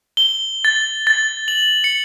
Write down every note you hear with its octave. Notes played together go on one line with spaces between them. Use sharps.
G7
A6
A6
F#7
C#7